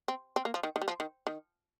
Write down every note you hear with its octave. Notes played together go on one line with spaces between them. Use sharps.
C4
C4
A#3
F3
D#3
D#3
G3
F3
D#3
D#3